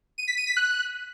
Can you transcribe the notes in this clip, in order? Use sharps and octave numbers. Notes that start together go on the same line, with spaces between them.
D#7
B6
D#7
B6
F#6